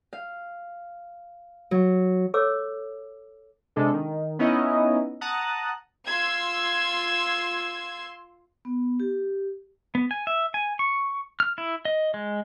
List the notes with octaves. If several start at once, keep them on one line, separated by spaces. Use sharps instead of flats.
F5
F#3
A4 C#5 D6 E6
C3 G#3 D4 A4
D#3
B3 C#4 D#4 E4 D#5
F#5 A5 A#5 D#6 F#6
F4 C6 E6 G#6
B3
G4
B3
G#5
E5
G#5
C#6
F6
E4
D#5
G#3